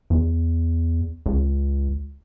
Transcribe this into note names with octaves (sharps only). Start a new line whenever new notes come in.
E2
C#2